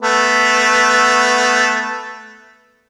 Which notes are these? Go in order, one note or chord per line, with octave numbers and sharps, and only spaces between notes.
A3 B3